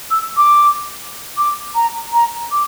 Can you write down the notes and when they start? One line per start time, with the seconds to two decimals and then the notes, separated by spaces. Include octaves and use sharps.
0.11 E6
0.37 D6
1.38 D6
1.75 A#5
2.13 A#5
2.52 D6